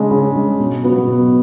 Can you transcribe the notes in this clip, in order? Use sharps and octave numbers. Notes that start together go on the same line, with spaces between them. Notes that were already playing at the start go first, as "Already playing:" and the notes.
Already playing: C#3 G#3 D4
C#3
G#3 D4
B2
F#3 B3 F#4
B2